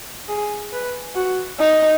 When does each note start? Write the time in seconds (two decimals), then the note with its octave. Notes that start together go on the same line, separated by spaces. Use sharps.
0.28 G#4
0.73 B4
1.16 F#4
1.60 D#4